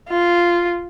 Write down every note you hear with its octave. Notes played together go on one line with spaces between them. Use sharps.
F4